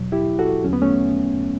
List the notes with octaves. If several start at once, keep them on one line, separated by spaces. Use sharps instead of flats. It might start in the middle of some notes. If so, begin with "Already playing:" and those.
Already playing: E2 B2 F#3
E4 G4
F#4 A4
E2 D3 F#3 C#4
B3
A3 C#4